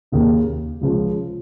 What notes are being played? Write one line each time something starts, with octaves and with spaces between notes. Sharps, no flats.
D#2 C#3 A#3
C#2 C#3 F3